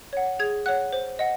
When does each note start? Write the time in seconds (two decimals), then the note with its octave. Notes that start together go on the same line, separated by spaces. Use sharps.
0.13 C#5 F#5
0.39 G#4 G#6
0.66 C#5 F#5 F#6
0.93 C5
1.19 D#5 F#5